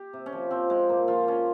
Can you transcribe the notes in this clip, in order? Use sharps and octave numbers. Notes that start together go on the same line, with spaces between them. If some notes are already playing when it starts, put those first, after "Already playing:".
Already playing: G4
C3
C#4
F3
F3 C4
F3 G#3
A#2 A#3
F3 F4
F3 C#4